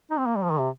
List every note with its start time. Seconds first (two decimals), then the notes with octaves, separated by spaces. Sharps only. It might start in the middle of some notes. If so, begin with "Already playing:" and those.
0.11 D#4
0.18 C4
0.26 A#3
0.36 G3
0.44 F3
0.52 D#3
0.59 C3